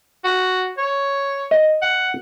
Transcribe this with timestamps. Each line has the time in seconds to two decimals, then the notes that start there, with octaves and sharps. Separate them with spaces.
0.24 F#4
0.78 C#5
1.51 D#5
1.82 F#5